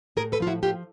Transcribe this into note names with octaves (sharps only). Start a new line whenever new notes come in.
A2 G#4 A#4
A4 B4
F3 F4
E4 F#4
F3 F4 G4